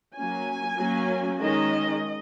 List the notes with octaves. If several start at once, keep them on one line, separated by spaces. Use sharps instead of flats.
F#3 A#3 C#4 G#5
F#3 A#3 C#4
D#3 G#3 C#4 D#5